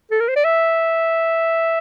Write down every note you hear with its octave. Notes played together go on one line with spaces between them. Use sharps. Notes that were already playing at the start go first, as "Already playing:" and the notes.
A4
A#4
C5
D5
E5